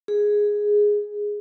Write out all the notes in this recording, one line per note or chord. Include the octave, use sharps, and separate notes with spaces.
G#4